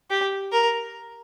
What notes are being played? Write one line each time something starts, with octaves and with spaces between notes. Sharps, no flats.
G4
A#4